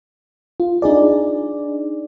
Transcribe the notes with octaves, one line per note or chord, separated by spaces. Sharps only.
F4
D4 D#4 G#4 D5